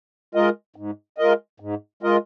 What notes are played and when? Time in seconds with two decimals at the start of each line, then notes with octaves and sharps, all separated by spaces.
0.35 G#3 F4 A#4 D#5
0.76 G#2
1.18 G#3 F4 A#4 D#5
1.60 G#2
2.03 G#3 F4 A#4 D#5